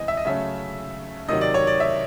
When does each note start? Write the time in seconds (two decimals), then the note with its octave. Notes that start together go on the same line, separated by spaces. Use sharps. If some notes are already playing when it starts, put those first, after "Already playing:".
Already playing: C3 E3 G#3 C4 D#5
0.08 E5
0.17 D#5
0.25 C#3 F#3 A3 C#4 E5
1.28 C3 D#3 F#3 D#5
1.41 D5
1.54 C#5
1.67 D5
1.80 E5